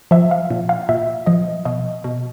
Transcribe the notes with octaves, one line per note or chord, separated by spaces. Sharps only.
F3 E5
F5
A#2
F5
A#2 E5
F3 D#5
B2 D#5
B2